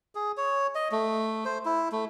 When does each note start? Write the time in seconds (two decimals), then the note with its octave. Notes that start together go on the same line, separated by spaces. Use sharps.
0.15 G#4
0.37 C#5
0.75 D#5
0.92 A3
1.45 C5
1.65 E4
1.92 A3